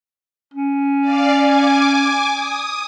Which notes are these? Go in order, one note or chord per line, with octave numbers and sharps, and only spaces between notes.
C#4
D5 F5
G#5 D6
D#6